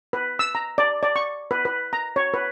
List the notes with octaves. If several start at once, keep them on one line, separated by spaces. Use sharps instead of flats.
B4
E6
A#5
D5
D5
C#6
B4
B4
A#5
C#5
B4